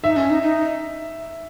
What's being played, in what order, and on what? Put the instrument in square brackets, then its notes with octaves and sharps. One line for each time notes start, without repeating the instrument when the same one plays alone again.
[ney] D#4 [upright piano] E5
[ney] C#4
D#4
D#4